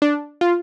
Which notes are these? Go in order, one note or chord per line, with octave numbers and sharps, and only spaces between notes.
D4
F4